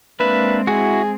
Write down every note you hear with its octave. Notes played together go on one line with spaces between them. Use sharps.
G#3 A#3 C4 D4 B4 E5
E4 F#4 G#4